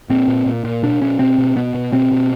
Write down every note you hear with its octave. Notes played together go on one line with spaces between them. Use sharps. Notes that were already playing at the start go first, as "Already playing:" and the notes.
A#2 C4
A#2
A#2
A#2
B2 D4
B2 C#4
B2 C4
B2
B2 B3
B2
B2 C4
B2